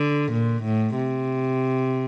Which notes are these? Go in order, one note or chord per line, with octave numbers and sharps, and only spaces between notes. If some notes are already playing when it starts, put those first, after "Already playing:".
Already playing: D3
A#2
A2
C3